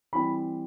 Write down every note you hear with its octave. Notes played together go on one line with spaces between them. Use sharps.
E3 G3 C4 B5